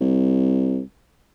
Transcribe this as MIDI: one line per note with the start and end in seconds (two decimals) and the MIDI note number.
0.01 0.81 36